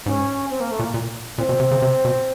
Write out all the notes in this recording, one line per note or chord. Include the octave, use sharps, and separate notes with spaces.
G#2 C#4
C4
A#3
A3
A#2
A#3
A#2
A#2 C4
B2
C3
C#3
C3
B2